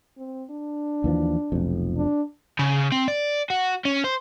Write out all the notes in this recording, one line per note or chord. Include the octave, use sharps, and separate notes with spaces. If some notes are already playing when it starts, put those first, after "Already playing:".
C4
D4
D#2 E3 F3
F1 B1 F2
D4
C#3
C4
D5
F#4
C#4
C5